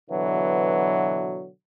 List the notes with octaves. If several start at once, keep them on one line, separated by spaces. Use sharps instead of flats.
B2 D3 E3 F#3